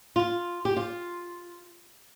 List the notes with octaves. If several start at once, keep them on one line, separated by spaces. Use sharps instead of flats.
F4
G4
F4